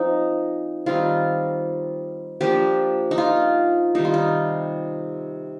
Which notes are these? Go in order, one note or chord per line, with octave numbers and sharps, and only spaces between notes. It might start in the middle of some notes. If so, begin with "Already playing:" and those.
Already playing: F3 C4 D#4
D#3 G3 C4 D#4 F4
F3 A#3 D4 G4
D#4
F4
C3 D#3 G3 D#4
F4
D#4